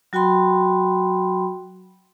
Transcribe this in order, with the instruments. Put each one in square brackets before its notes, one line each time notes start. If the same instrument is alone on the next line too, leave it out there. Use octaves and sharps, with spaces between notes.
[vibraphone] F#3 F#4 G5 B5 C6